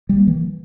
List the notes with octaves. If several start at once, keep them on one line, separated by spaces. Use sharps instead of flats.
G3
A#3
E3